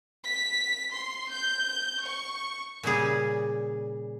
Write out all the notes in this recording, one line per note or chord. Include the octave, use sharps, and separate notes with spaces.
B6
C6
G6
C#6
A#2 C#3 G3 G#4